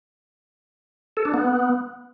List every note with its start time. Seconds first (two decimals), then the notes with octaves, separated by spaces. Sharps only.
1.17 A4
1.25 D4
1.34 B3